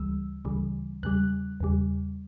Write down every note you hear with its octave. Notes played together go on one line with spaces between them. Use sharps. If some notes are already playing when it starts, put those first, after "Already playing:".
Already playing: D2 C#3 E3 G3 E6
D2 C#3 E3 G3
E2 C#3 G3 F#6
E2 C#3 G3